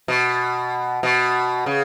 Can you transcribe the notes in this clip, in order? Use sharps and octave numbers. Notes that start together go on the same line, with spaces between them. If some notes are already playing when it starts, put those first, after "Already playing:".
B2
B2
C#3